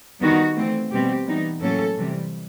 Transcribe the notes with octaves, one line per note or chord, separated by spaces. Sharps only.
D#3 G3 B3 D#4 F#4
E3 A3 C4
B2 G3 C4 G4
E3 G3 B3 D#4
A2 F#3 A#3 C#4 A4
C3 E3 G3